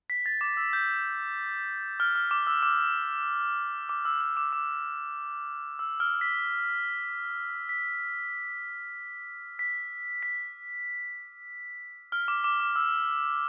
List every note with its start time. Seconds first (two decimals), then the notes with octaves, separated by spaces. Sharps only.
0.10 B6
0.26 A6
0.41 D6
0.57 E6
0.73 G6
2.00 F6
2.15 F6
2.31 D6
2.47 E6
2.63 D6
3.89 D6
4.05 E6
4.21 E6
4.37 D6
4.53 D6
5.79 E6
6.00 F6
6.21 B6
7.69 B6
9.59 B6
10.23 B6
12.12 F6
12.28 D6
12.44 D6
12.60 D6
12.76 E6